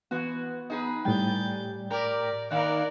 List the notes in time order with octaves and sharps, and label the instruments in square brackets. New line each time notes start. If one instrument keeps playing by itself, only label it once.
[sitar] E3 F#4 [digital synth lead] B3
[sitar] D#4 G#4 B4
[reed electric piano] A2 G5 [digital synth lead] G3 [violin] G6 A6
[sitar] G4 A#4 [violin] D5 [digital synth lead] A#5
[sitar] D#3 A#3 D#4 [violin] A#4 D5 [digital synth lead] F#6